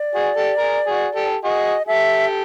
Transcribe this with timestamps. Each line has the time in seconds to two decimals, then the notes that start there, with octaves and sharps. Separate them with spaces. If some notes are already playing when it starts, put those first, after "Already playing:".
Already playing: D5
0.15 F#4 G#4
0.36 G4 A4
0.58 G#4 A#4
0.87 F#4 G#4
1.15 G4 A4
1.44 F#4 G#4 D#5
1.87 G4 A4 E5